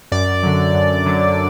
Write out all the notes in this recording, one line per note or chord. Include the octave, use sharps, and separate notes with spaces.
F#2 D5
D3 F#3
F#2
D3 F#3